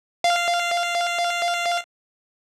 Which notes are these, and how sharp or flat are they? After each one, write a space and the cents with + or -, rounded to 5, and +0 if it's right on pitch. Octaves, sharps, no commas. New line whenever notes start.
F5 -10